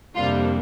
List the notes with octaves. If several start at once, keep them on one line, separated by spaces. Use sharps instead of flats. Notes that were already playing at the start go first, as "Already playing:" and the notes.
F2 C3 G3 A#3 D4 F4